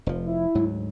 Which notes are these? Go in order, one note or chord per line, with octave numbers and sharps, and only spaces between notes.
F1 F3
E4
D2 G#2 F#3